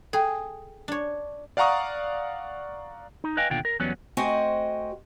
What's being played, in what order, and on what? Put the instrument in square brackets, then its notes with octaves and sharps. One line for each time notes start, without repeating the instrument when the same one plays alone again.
[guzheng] G#4 [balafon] A4 G5
[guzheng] D4 C#5
[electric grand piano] D5 F5 F#5 A#5 C#6 D#6
[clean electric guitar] D#4
B4 D#5 F5 G5 G#5
D#2 B2 D3 F4 G5
A#4
E2 F#3 G3 B3 C#4
[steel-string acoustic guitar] A3 C4 F#4 C5 D#5 G#5